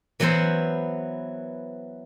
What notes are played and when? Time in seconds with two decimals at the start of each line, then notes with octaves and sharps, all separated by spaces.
0.20 E3 F#3 B3 E4 C5